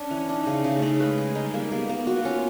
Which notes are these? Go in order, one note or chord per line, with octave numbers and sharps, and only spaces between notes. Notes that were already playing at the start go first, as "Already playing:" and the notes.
Already playing: C#4 D4
E3
D4 D#4
C#3
C#3 A3
C#3
G#3 B4
G#4
G3 D#4
A#3
A#3 B3
A#3
F4 F#4
C#4